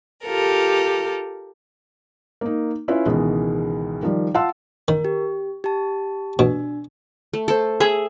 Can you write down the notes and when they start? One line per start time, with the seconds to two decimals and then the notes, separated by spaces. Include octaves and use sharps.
0.24 F4 G4 A4 A#4
2.41 A#3 D#4
2.88 C#4 E4 F4 B4 C#5
3.06 C#2 B2 D#3 E3 G#3
4.03 D#3 F3 G3
4.34 F4 F5 F#5 A5 C6 E6
4.88 D#3 A#4
5.05 G4
5.64 G4 A5
6.39 B2 D4
7.33 A3
7.48 A4 C5
7.80 G#4 E5